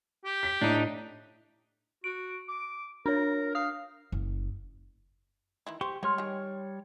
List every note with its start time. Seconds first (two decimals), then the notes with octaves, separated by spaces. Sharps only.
0.25 G4
0.43 B6
0.61 A2 D4 D#4
2.04 F#4 D7
2.49 D6
3.06 D4 A#4 C#5
3.55 F5 D#6
4.12 F#1
5.67 D#3 E3 E4
5.81 G4 C5 C#6
6.03 G3 G#3 C#5 F6
6.18 D#3 G#4